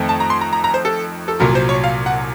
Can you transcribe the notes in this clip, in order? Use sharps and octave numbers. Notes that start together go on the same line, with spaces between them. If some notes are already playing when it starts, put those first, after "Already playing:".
Already playing: F2 D#3 A3 C4 D#4
A5
A#5
C6
A#5
A#5
A#5
C5
A4
A4
C2 A#2 F#3 A#4
C5
C#5
F5
F#5